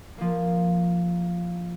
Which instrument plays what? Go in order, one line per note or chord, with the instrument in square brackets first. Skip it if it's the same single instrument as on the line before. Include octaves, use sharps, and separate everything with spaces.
[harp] F3 A#3